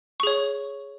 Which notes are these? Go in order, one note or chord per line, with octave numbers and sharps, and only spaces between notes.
G#4 C#5 C#6